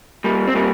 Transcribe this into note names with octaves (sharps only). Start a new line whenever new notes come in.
G3 A#3
C4
G3 A#3